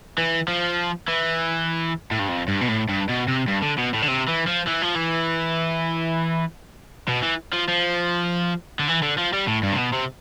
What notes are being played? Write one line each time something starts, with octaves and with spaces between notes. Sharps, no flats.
E3
F3
E3
A2
G2
F2
G2
B2
A2
G2
B2
C3
G2
D3
B2
A2
D3
C3
E3
F3
E3
F3
E3
B2
E3
F3
F3
D3
E3
D3
F3
G3
A2
G2
C3
B2
C3